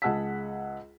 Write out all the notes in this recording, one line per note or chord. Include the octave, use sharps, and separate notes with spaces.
C#2 G#4 F#5 A5 E6 B6